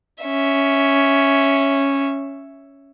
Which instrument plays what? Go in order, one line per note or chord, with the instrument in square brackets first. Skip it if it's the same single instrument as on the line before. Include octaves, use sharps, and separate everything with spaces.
[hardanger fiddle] C#4 E5